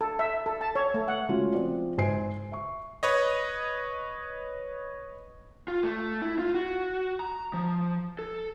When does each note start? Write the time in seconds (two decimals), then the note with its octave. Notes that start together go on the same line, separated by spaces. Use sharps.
0.01 A4
0.19 E5
0.46 A4
0.61 A5
0.75 C#5
0.94 A3
1.08 F#5
1.29 G#3 A3 C#4 F4 F#4
1.54 F3 C4 D5
1.98 G#1 C5 G#5 C7 D7
2.52 E5 C#6
3.03 B4 C#5 D#5
5.68 F4
5.83 A3
6.22 E4
6.39 F4
6.54 F#4
7.20 A#5
7.54 F3
8.19 A4